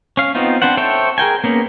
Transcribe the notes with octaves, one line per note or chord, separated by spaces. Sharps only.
C#4 F5
B3 C4 D#4 F4
C4 D4 B4 C5 F#5
A4 C5 C#5 E5 G5
G#4 A#4 G5 G#5
A#3 B3 C#4